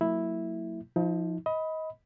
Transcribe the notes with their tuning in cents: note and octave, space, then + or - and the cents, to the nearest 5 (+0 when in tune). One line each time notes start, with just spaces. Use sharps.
F#3 -25 A#3 -40 E4 -5
F3 +0 D#4 +35
D#5 +25 B5 +0